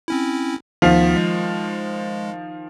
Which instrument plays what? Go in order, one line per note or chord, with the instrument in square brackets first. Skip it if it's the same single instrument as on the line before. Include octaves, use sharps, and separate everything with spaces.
[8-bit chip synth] C4 C#4 E4
[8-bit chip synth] D2 B3 B6 [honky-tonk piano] D#3 F3 F4
[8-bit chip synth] G#3